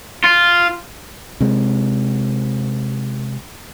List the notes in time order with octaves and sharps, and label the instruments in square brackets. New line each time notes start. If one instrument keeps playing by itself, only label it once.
[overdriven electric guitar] F4
[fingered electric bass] C3 G#3